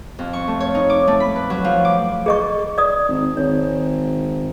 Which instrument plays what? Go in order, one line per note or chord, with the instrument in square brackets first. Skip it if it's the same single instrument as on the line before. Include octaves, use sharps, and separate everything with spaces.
[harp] F2
C#6
A3
C#5
D#4
D6
A3
B5
B4
F#3
F3
D6
[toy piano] G#4 D#5 C#6
D5 D#6
[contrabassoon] G#1
[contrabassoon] G#1 [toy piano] C#5